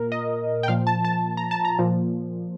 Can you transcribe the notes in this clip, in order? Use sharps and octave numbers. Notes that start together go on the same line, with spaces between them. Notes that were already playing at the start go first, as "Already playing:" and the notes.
Already playing: A#2 A#4
D#5
G5
A#2 F3 F5
A5
A5
A#5
A5
A#5
A#2 F3